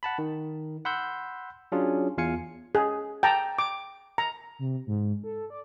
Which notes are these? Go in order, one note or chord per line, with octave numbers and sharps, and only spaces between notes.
F#5 A5 B5
D#3
F#5 B5 C6 E6 G6
F#3 C#4 D4 F4 G#4
E2 F4 F5 G#5 C#7
G#4
G5 A5 A#5
D6
A#5
C3
G#2
A4
D5